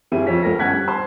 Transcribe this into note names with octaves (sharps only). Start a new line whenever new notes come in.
G1 G3 C4 E4 G#4 D#7
F2 C5 C#5 B6
C#2 A4 A#4 A#6
G1 C#4 F#5 F#6 G#6 B6
G3
C5 A5 C6